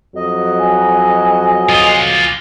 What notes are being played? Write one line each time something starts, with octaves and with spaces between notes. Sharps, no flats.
F2 F#3 D#5
G#5
F4 G#4